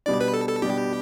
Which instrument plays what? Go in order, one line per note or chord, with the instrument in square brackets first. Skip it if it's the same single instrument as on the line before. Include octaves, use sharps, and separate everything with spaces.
[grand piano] B2 G3 D4 [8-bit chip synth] D5
[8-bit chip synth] B4
A4
A4
[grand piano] B2 G3 D4 [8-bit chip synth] G4